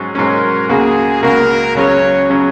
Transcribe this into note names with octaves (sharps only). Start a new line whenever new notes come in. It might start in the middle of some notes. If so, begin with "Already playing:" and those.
Already playing: G#2 F#3 C#4
G#2 F#3 C#4 A#4
C#2 C#3 A#3 F#4 G#4
C#2 C#3 A#3 F#4 A#4
C#2 C#3 F#3 C#4 C#5
C#3 F#3 C#4